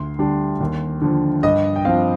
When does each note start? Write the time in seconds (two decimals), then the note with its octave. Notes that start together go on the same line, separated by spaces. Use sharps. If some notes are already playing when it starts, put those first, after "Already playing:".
Already playing: D2 C6
0.19 D3 G3 D4
0.61 D#2
1.01 D3 F3
1.43 G2 D#5
1.76 G5
1.85 F3 C4 F5